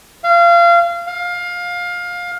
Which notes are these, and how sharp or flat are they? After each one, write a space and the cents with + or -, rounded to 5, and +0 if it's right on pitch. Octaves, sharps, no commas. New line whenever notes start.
F5 -25
F5 +20